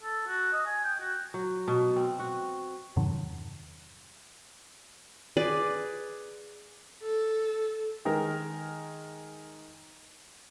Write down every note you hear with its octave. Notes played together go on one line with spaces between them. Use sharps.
A4
F#4
D#5
G#5
G5
F#4
F#3
B2
C4
F#4
E2 G2 C3 D#3 E3 F#3
G#4 B4 D5
A4
D#3 G#3 A#4